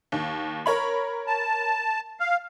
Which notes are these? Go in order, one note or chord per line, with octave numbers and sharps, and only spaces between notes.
D#2
A#4 C#5 B5
A5
F5